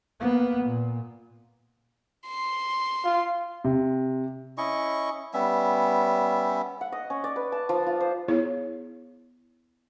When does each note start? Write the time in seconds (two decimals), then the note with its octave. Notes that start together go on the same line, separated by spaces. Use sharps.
0.20 A#3 B3
0.64 A#2
2.28 C6
3.05 F4
3.64 C3
4.58 C#4 E4 D#5 C#6
5.34 G3 B3 C#4 E5
6.81 F#5
6.92 D#5
7.10 C#4
7.24 D5
7.36 B4
7.52 A5
7.69 F3
7.87 F4
8.01 C5
8.28 B3 E4 G#4 C#5